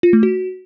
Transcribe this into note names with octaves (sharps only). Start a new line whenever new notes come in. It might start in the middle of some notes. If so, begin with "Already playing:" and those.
F4
A3
F#4